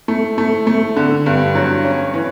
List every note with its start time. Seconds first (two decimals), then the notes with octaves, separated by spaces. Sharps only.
0.08 A3
0.38 A3
0.67 A3
0.97 D3
1.26 G2
1.55 F#3
1.85 C#4
2.14 E3